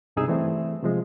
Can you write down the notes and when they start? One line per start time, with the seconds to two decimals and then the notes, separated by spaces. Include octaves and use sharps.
0.16 C#2 G2 C3 D#4 G#4 E6
0.28 E3 G3 A3 C4
0.83 C3 F3 G#3